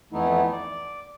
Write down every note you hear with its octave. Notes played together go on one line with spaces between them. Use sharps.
F2 E3 A3 B3 D#4 E4
D5